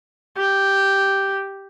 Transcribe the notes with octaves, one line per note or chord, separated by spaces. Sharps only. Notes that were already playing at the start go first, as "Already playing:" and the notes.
G4